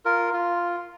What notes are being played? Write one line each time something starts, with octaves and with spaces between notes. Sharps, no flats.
F4 A#4
F4